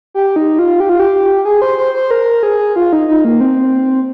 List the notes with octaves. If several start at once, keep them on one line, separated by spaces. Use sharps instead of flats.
G4
D#4
F4
G4
F4
G4
G#4
C5
C5
C5
A#4
G#4
F4
D#4
D#4
A#3
C4